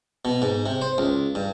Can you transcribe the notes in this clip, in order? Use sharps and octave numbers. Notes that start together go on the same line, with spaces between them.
B2
G#2
C3
C5
C#2
G2